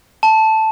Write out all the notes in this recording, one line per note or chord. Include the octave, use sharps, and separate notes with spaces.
A5